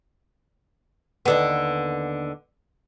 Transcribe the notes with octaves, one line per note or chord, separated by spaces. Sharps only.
D#2 D3 B3